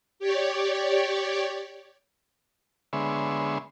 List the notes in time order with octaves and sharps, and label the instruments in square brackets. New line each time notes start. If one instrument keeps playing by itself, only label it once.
[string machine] G4 C#5 D5
[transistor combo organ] D3 G#3 B3 C#5 E5 C6